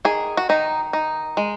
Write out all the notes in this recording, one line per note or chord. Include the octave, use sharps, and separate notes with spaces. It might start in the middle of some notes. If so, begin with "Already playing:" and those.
D#3 G#4
F#4
D#3 D#4
D#4
G#3